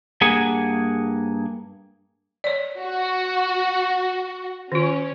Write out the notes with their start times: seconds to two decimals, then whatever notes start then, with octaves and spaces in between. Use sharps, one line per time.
0.21 G2 A#3 G#4 F#5 G#5
2.44 C#5 D5
2.82 F#4
4.72 D#3 C#4 F4